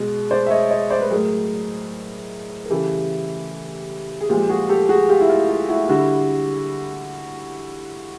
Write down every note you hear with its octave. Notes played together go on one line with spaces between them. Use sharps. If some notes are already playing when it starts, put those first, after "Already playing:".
Already playing: B2 G#3
C5 D5
E5
C#5 D#5
C#5 D#5
C5 D5
B4
A2 F#3 G#4 A#4
A#4
C#3 E3 G3 G4 A4
G#4
A#2 F3 G#3 F4 G4
F#4 G#4
G4 A4
F#4 G#4
F4 G4
E4
F4
F4
E4 F#4
D3 G3 E4 F#4